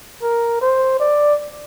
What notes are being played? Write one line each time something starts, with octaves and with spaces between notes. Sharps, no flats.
A#4
C5
D5